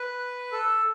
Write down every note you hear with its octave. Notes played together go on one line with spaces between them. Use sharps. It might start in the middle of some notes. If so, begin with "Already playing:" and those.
Already playing: B4
A4